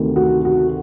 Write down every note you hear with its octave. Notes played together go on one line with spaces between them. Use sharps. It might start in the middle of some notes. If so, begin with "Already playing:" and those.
Already playing: D2 C3 D#3
F#4
F#4